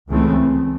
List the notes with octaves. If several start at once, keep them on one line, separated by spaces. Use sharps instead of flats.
C#2 C#3 E3 A3 C4